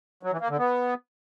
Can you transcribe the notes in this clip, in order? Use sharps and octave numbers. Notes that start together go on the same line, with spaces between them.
F#3
E3
A#3
D3
B3